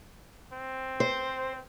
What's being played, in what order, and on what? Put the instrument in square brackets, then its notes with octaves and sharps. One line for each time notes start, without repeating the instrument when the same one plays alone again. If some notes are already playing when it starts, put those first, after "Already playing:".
[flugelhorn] C4
[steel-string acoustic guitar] C5